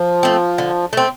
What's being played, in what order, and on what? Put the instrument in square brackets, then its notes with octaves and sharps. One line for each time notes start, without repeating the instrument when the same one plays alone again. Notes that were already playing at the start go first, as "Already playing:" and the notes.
Already playing: [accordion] F3
[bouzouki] A3 C4
D3
A3 C4